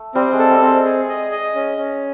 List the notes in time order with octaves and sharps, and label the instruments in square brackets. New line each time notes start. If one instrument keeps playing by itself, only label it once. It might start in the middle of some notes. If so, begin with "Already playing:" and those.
Already playing: [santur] A3
[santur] G3 [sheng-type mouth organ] C4
[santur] G#3
[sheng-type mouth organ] A4
[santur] G3
[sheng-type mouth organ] C4
[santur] G#3
[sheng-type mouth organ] G#4
D#5
D#5
C#4
C#4